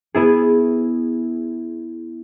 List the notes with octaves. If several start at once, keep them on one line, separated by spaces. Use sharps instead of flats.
B3 E4 G#4